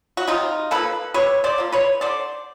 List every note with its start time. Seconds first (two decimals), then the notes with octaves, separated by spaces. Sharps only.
0.17 F#4
0.27 C3 D#4 F4
0.71 F3 A#3 A4 B4
1.14 C3 B4 C#5
1.44 C5 D5
1.58 F3 A#3
1.72 B4 C#5
2.01 D3 C5 D5